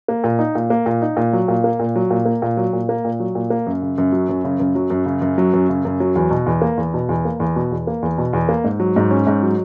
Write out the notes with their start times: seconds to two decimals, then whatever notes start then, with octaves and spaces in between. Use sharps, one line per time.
0.08 A#3
0.24 A#2
0.39 D#4
0.55 A#2
0.70 A#3
0.86 A#2
1.02 D#4
1.17 A#2
1.33 F#3
1.48 A#2
1.64 A#3
1.80 A#2
1.96 F#3
2.11 A#2
2.26 A#3
2.42 A#2
2.57 F#3
2.73 A#2
2.89 A#3
3.05 A#2
3.20 F#3
3.35 A#2
3.50 A#3
3.67 F#2
3.82 C#3
3.98 F#2
4.12 F#3
4.29 F#2
4.44 C#3
4.60 F#2
4.75 F#3
4.90 F#2
5.06 C#3
5.22 F#2
5.38 F#3
5.54 F#2
5.69 C#3
5.85 F#2
6.00 F#3
6.15 E2
6.30 B2
6.46 E2
6.62 A#3
6.77 E2
6.94 B2
7.09 E2
7.25 A#3
7.40 E2
7.56 B2
7.71 E2
7.87 A#3
8.02 E2
8.18 B2
8.33 E2
8.49 A#3
8.64 G#2
8.80 F#3
8.96 G#2
9.11 C#4
9.27 G#2
9.43 F#3